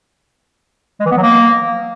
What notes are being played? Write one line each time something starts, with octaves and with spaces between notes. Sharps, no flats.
G#3
E3
B3
F#3
A#3